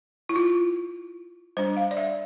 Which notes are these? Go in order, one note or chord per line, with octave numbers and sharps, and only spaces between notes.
E4
F4
G3 D4 C5
F5
D5
E5